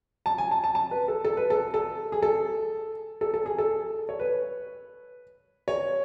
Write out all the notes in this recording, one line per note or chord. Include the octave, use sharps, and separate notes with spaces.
A5
G#5
A5
A5
A5
B4
A4
A4
B4
A4
A4
G#4
A4
A4
A4
G#4
A4
C#5
B4
C#5